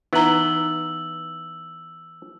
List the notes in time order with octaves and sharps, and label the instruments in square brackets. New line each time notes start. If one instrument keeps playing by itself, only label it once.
[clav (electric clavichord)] E3 B3 [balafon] D#4 A#5 [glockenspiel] E6 F#7 G7